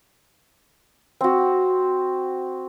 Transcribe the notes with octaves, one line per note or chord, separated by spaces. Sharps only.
C4 F#4